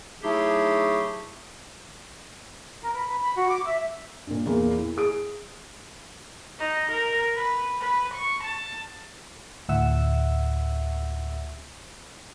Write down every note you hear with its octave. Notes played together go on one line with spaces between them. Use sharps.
F#3 A3 D#4 E4 G4 G#4
A#4
B4
B4
B5
F#4
D6
E5
G2 A#2
E2 A#2 A#3
E4
G#4 D#6 D7
D#4
A#4
B4
B4
C#6
A5
D2 A2 E5 F#5 E6